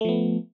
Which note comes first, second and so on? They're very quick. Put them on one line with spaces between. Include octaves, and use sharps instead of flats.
A3 F3 B3